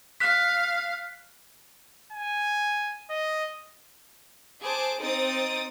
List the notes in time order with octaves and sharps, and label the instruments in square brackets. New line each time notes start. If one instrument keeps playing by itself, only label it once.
[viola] F5 [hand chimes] F#6 B6
[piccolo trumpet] G#5
D#5
[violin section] G#4 C5 A5 D6
C4 D#4 D#6 A6 D7